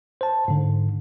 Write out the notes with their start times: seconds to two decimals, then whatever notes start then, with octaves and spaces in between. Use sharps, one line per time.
0.21 C5 A5
0.48 G#2 D3